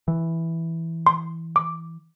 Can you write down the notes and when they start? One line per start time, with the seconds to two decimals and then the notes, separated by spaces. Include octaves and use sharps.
0.08 E3
1.07 C6
1.56 D6